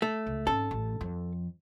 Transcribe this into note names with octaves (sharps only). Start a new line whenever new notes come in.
A3
C#2
G#1 C#4 A4
A1
F2 F3